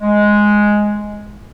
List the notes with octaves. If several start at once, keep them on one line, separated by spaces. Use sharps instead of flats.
G#3